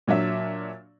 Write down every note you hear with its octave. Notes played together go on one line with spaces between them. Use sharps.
A#2 F#3 D4 E5